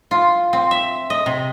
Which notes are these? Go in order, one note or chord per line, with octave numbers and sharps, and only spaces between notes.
F4
C4
E5
D#5
C3